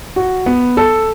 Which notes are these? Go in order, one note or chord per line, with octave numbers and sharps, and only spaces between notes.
F#4
B3
A4